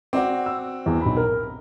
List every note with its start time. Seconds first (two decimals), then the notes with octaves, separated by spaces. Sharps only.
0.13 C4 F#4 D5 D6
0.46 E6
0.86 E2
1.01 B1 B5
1.17 A#4